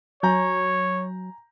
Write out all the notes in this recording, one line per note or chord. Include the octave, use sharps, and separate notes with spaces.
F#3 C#5 G#5 A#5 G6